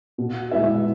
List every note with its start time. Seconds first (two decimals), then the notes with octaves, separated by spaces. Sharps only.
0.18 B2
0.51 G#3 B3 E4 E5